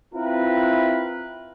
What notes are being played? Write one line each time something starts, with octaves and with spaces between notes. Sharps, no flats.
C4 E4 F4 A#4 B4